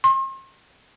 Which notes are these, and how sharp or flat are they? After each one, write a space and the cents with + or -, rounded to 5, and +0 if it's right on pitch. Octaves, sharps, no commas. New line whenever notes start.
C6 +40